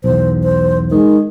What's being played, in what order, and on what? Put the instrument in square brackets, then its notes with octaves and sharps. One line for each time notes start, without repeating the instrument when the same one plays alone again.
[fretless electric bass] B1 E2 [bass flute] C5
[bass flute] C5
[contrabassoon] D#3 [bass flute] G#3